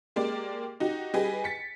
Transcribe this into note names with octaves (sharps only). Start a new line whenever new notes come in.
G#3 A#3 G4 D5
D#4 F#4 G4
G3 G#4 B4 D#5 G5 G#5
A6 B6 C#7